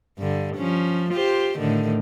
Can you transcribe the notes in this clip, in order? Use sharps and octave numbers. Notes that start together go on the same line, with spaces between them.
G2 D3
F3 C#4
F4 G4 C5
A2 D3 D#3